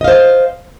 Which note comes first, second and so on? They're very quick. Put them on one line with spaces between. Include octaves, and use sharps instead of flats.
D#5 F5 C5